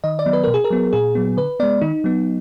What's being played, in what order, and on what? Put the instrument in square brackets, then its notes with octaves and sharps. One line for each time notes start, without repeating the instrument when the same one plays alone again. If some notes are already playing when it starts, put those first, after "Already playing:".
[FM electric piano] D#3 D#5
D5
F#3 B3
B4
B2 A#4
G#4
A#4
F#3 B3
A#2 G#4
F#3 B3
D3 B4
G#3 B3 D5
D#3 D#4
F#3 B3